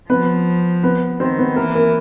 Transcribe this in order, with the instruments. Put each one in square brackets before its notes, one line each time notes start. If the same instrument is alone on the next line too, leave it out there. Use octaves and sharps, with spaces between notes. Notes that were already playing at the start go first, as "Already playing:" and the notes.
[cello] F3 [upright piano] B3 B4
[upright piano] B3 B4
[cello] D#3 [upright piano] C4 C5
[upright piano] B3 B4
[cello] E3 [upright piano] A#3 A#4
[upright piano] A#3 A#4